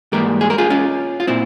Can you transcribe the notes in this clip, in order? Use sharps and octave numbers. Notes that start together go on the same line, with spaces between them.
G#2 E3 G3 A#3 G4 A#4
G#4
A#4
F4 G#4
C#4 F4
F4
A#2 C4 E4